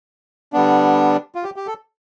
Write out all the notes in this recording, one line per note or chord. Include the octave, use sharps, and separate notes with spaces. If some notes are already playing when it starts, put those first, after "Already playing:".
D3 G3 B3 D4
F4
G4
G4
A4